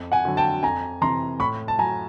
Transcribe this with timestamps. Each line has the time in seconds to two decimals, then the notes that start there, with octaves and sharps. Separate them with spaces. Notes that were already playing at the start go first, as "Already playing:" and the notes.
Already playing: F2
0.12 F#5 G#5
0.25 D3 F#3
0.37 G5 A5
0.63 F2 G#5 A#5
1.01 C3 E3 A#5 C6
1.40 A2 B5 C#6
1.68 A5
1.78 F#3 G#5 A#5